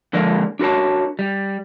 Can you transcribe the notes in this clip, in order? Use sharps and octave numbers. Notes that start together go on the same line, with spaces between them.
D3 F3 G#3 A#3 A#4 D5
D4 F#4 A#4 C#5 A5
G3